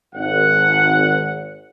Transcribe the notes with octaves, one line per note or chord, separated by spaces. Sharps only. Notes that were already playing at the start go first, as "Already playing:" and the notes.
G#1 F#5